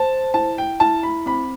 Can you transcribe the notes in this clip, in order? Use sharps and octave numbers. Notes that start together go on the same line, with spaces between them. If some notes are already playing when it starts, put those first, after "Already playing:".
Already playing: C5 A5
E4 A5
G5
E4 A5
B5
C4 B5